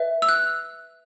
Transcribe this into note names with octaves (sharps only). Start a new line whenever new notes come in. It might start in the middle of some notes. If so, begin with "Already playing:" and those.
Already playing: B4 E5
E6
F#6